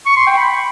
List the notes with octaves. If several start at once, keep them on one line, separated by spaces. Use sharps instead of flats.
C#6
C6
G5
B5